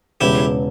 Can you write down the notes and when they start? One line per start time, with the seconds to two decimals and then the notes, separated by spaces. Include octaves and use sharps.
0.21 E1 E2 C#3 E4 G4